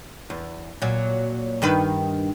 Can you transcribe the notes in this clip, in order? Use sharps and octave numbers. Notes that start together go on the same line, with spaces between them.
E2
A#2 F#3
G2 D#3 B4